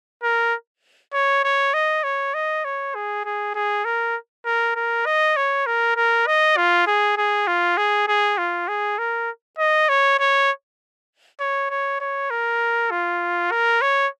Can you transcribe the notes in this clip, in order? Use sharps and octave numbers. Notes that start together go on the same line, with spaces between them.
A#4
C#5
C#5
D#5
C#5
D#5
C#5
G#4
G#4
G#4
A#4
A#4
A#4
D#5
C#5
A#4
A#4
D#5
F4
G#4
G#4
F4
G#4
G#4
F4
G#4
A#4
D#5
C#5
C#5
C#5
C#5
C#5
A#4
F4
A#4
C#5